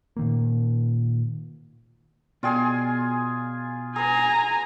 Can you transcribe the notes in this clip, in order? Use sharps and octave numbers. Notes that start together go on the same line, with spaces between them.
A#2 D#3 A#3
B2 F4 G#4 D5 G5 G#5
G#4 B4 G#5 A#5